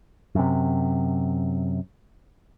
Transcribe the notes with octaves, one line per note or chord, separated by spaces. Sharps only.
F#2 C3